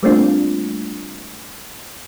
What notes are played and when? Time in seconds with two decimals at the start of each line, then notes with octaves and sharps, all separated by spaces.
0.03 G3 A3 A#3 C4 D4 F4